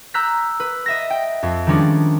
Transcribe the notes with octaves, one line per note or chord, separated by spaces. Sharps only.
A#5 E6 F#6 G6 B6
B4
D#5 E5 A#6
G5
F2
D#3 F3 G3 G#3 C#4 D4